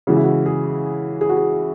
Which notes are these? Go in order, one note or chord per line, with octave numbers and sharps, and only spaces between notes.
C#3 E3 G#3 F#4
E4
F#4
G#4
G#4
F#4
G#4